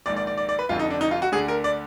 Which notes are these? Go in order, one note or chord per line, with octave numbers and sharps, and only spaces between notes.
A#1 G#2 D#3 D5
D5
D5
D5
D5
B4
F1 F2 D3 F4
D#4
D4
D#4
F4
F#4
D2 D3 G#4
A#4
D5